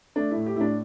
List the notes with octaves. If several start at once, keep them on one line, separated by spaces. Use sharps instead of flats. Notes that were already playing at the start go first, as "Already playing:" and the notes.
A3 D4
A2 E4
G4
A2 E4
D4